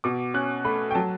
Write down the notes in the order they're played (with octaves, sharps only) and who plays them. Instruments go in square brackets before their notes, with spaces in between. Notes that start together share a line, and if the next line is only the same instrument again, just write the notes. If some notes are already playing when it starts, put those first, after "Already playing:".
[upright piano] B2 D6
C#4 F#6
A3 B5
G5
F#3 A5